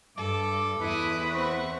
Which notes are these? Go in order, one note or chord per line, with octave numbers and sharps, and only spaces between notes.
G2 A4 D6
E2 E4 B4 D#6
C4 F#5 C#6